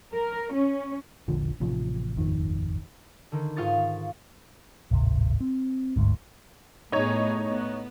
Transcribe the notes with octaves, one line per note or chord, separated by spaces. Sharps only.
A#4
C#4
E1 A#1 D3 F3
A1 C3 F3
D#1 G#1 F2 D#3
D3 D#3
G#2 F4 F5 C#6 D#6 A6
D1 G#1 C3
C4
G1 D2 G#2
A2 B3 D#4 G#4 C#5
B3